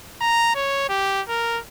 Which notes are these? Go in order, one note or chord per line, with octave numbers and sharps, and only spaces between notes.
A#5
C#5
G4
A#4